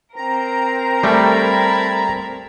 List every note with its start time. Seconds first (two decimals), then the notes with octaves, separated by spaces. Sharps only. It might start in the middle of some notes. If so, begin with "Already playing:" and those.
0.16 C4 A#4 A#5
1.03 G3 A3 A5 B5 G#6